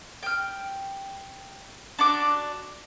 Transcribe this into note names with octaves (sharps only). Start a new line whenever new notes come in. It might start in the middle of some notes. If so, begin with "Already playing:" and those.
G5 F6
D4 F#4 D6